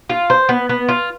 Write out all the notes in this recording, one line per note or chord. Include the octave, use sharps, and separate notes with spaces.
F4
C5
B3
B3
F4